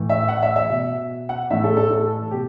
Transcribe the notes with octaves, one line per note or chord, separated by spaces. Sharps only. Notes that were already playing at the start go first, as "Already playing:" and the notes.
Already playing: A2 E3
E5
F#5
E5
E5
B2
F#5
A2 E3 E5
A4
A4
A4
B2 G4